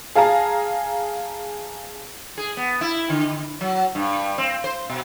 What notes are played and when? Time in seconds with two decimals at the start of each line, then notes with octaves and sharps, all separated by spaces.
0.15 G#4 F5 A5 A#5
2.38 G#4
2.57 B3
2.81 E4
3.10 D3
3.61 F#3
3.95 G2
4.38 C4
4.64 C5
4.89 B2